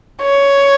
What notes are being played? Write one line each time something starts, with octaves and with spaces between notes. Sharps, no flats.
C#5